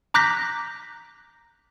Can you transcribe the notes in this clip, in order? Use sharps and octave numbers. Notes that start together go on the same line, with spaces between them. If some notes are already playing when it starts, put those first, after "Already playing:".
A#5 D6 F#6 G6 A#6 B6